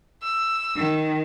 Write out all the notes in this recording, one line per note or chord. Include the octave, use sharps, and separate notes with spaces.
E6
D#3